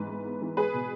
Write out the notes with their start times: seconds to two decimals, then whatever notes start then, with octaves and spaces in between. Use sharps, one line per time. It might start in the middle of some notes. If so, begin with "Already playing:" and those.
Already playing: G#2 E3 B3 B4
0.10 G#2
0.26 B3
0.42 E3
0.57 G#3 G#4 B4
0.74 B2